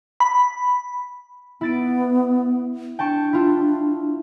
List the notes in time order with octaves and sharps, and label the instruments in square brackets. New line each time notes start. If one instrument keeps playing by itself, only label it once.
[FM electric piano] B5
[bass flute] B3 [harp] E4 A6 D7
[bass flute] D4 [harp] G5 A5 C#6
[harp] E4 F4